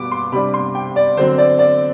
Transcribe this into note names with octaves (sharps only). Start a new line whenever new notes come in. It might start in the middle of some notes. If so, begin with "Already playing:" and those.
Already playing: B2 G3 B3 D6
C6
C3 G3 D4 B5
C6
G5
D5
D3 F#3 C4 C5
D5
D5